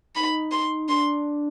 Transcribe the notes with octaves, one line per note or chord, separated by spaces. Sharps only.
D#4 B5
C6
D4 C6